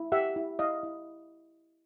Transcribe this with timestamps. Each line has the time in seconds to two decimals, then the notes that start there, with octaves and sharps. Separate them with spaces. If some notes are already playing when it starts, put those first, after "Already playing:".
Already playing: E4
0.12 G4 E5 F#5
0.36 E4
0.59 E4 D#5 F5
0.83 E4